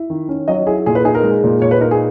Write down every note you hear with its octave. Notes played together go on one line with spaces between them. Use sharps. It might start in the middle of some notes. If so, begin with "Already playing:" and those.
Already playing: E4
D#3
C#4
F#3 D#5
E4 G#4
A#2 G#4
B4
D#4 G#4
A#4
G#3
A#2
A#2 C#5
B4
D#4 A#4
G#4